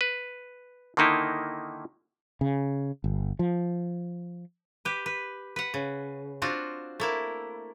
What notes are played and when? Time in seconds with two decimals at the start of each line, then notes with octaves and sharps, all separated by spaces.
0.01 B4
0.97 D3 D#3 A#3 D#4 E4
2.41 C#3
3.04 G1
3.39 F3
4.85 G4 B4
5.06 B4
5.56 B4 F#5
5.74 C#3
6.42 C4 D4 F4 F#4
7.00 A3 A#3 E4